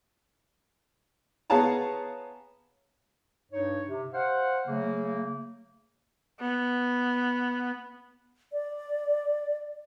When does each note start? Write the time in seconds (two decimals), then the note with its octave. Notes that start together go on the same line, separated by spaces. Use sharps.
1.50 B3 G#4 C#5 F5 A5 A#5
3.51 G2 D#4 C#5
3.86 C3
4.14 C5 F5 F#5
4.66 C#3 F#3 A3 A#3
6.41 B3
8.52 D5